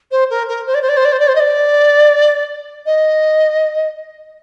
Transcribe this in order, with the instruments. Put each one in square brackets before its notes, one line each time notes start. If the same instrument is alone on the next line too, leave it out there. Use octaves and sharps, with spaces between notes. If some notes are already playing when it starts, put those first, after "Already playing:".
[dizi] C5
A#4
A#4
C5
D5
C5
D5
C5
D5
C5
D5
C5
D#5
D5
D#5